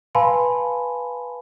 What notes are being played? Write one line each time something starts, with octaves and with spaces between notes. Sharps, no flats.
B4 F5 G#5 A5 B5 C6